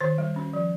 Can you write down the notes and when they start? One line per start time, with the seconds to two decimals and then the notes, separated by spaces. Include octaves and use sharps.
0.01 D#3 C5
0.18 G3
0.36 C#4
0.53 F3